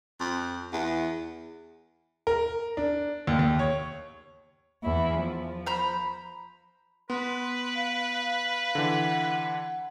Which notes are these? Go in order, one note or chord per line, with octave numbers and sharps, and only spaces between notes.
F2
E2
A#4
D4
D#2
D#2
C#5
E2 E4
F3
C5 A#5 B5
B3 B4 C6
F5
D3 E3 F#5